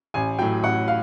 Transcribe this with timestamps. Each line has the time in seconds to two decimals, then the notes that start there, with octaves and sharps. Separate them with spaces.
0.14 A1 G#5
0.39 A2 F#3 G5
0.63 A1 F#5
0.88 F5